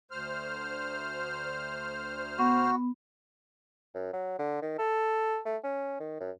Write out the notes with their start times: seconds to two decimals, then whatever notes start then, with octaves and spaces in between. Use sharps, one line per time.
0.11 D2 C5 F6
2.39 B3 F#4
3.95 F#2
4.13 F#3
4.39 D3
4.62 D#3
4.78 A4
5.46 A3
5.64 C#4
6.00 D#3
6.20 F#2